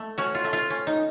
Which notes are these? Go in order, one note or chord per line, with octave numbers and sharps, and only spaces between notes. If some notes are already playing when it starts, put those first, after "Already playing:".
Already playing: A3
C#4 F#4
F4
A3
F4
C#4
D#4